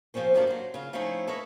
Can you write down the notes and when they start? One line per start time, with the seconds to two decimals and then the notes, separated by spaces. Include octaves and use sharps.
0.14 C3 F3 G3 C4 C#4 C5
0.34 F#2 A2 C3 A#3 D4 A4
0.47 F#3 C5
0.74 C#3 F4
0.93 F3 A3 C4 C#4 D#4 E4
1.27 A4 B4 C#5 D#5 E5